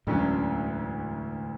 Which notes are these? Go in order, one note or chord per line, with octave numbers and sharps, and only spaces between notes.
E1 D2 A2 D3 F#3 C#4